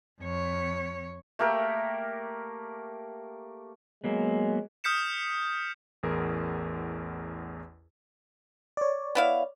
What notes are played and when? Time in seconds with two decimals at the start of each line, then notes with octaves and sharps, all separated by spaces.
0.21 F2 C#5
1.39 A3 A#3 G4 A#4
4.04 F#3 G#3 A#3 B3
4.84 D#6 F6 G6 B6 C#7 E7
6.03 A1 E2 G#4 A#4
8.77 C#5 D5
9.15 B3 E4 F5